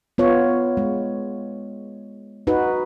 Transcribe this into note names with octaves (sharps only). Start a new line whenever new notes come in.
B3 F4 C#5
G#3
D#4 F#4 B4